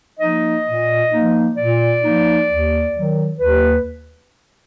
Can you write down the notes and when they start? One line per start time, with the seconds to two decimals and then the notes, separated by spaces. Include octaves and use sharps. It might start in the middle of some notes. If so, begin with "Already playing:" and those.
0.20 F3 A#3 D#4 D#5
0.65 A#2
1.11 F3 A#3 D#4
1.57 A#2 D5
2.03 F3 A#3 D#4
2.49 D#2
2.94 D#3 F#3
3.40 D#2 B4